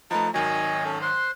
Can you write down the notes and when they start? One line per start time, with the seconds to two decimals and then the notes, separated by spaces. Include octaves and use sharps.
0.11 F3 A3 D#4 B4 A5 A#5
0.34 G#1 D#3 F#3 C#5 D#5 G#5
0.85 C#4 A4
1.01 C5 C6 F#6